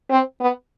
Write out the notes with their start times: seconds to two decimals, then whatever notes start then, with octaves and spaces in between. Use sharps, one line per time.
0.10 C4
0.40 B3